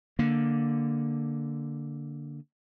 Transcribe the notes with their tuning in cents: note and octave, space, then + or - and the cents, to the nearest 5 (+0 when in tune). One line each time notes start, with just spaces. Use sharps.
D3 +0 A#3 +0